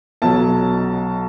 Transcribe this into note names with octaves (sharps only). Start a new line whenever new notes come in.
B1 B2 F#3 A5